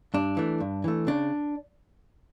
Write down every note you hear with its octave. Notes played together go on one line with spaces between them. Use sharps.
G2 D4
E3 A3
G2
E3 A3
C#3 D4